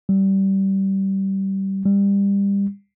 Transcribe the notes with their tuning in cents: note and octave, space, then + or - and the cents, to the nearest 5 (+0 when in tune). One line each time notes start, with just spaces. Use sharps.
G3 -20
G3 +25